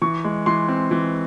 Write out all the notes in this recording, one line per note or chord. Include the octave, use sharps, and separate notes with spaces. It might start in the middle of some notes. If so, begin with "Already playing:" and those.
E3 C#6
G#3
E3 C6
C4
E3